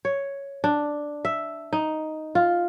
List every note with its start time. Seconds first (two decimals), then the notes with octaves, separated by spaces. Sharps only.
0.05 C#5
0.64 D4
1.25 E5
1.73 D#4
2.35 F4